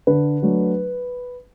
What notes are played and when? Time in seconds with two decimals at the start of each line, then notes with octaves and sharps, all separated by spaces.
0.07 D3 B4
0.42 F#3 A3 D4